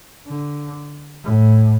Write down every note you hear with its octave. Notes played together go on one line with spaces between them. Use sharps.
D3
A2